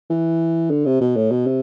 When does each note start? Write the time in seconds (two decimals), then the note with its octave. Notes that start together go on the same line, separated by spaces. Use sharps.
0.10 E3
0.71 D3
0.86 C3
1.01 B2
1.16 A2
1.31 B2
1.47 C3